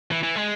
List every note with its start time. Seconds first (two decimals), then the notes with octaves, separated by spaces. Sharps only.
0.11 E3
0.23 E3
0.36 G#3